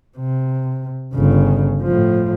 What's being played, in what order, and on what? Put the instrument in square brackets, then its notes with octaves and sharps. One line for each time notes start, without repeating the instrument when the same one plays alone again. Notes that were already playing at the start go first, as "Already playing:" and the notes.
[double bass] C3
G1 C#3
A2 F3